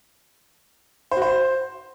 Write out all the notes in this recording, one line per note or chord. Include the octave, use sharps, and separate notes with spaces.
C5
F#4
C5